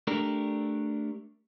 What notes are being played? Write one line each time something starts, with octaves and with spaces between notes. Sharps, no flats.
A3 D4 G4 A#4